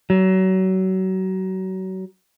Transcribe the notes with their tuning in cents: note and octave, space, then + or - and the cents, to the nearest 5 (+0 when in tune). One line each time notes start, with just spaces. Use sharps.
F#3 +30